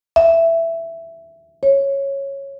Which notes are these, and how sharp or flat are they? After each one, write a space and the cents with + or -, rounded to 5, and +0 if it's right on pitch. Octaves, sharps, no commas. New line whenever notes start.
E5 +10
C#5 -10